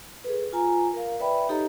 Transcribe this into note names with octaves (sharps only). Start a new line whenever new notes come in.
G#4 A4 B4
F4 G#5 A#5
A#4 F5
B4 D5 E5 G5 B5
D#4 G4 A4 C#5 D#5 A#5